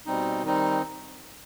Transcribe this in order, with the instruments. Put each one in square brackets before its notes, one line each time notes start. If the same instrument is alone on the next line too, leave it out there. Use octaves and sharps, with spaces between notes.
[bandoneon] B2 G3 C4 D#4
D#3 G3 C4 D#4